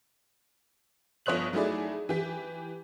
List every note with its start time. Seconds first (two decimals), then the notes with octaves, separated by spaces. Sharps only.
1.26 G1 F3 C#5 D#6 F#6 F#7
1.53 F#3 A3 D#4 E4 G#4 D5
2.09 E3 G4 B6